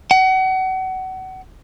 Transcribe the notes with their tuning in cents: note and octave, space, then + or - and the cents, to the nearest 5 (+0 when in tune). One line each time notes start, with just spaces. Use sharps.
F#5 +30